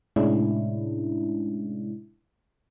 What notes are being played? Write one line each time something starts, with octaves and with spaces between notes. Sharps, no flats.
A2 C3 G#3 C#4 D4 E4